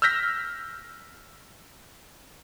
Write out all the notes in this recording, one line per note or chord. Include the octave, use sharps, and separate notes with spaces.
E6 F6 G6 A#6 B6